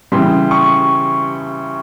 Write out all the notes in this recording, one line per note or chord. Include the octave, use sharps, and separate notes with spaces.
C#3 E3 G3 C6
C#6